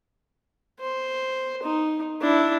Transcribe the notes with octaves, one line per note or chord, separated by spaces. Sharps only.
C5
D#4
D4 E4